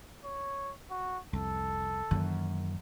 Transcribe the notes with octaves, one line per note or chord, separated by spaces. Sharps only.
C#5
F#4
C2 F2 A4
F#2 D#3 E3 A#3